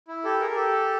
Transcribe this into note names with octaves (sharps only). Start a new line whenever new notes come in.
E4
G4 A4
G#4 A#4
G#4
G4 A4